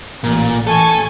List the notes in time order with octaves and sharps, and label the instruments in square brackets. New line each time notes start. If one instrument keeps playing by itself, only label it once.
[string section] A1 [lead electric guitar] A#2
[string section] A1 G#5 C#6 [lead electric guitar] A4